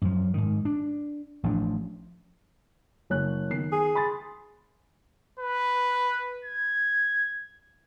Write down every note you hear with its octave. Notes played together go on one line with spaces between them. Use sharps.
F#2 F3
G#2 D#3
D4
A1 F3 D4
F#1 C#5 F#6
D#3 B3 C7
G#4
B5 C6 A6
B4
G#6